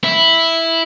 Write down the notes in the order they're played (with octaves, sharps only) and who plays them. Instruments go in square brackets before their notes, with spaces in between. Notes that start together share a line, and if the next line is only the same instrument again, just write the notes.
[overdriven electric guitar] E4